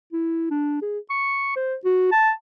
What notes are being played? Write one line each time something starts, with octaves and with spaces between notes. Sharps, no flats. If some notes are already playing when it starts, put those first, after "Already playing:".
E4
D4
G#4
C#6
C5
F#4
A5